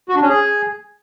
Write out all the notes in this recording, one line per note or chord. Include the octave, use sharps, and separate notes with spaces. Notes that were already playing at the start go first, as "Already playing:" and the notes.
F#4
D4
C#4
G#4